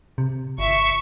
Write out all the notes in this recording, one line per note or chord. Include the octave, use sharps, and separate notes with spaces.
C3
G1 E5 C#6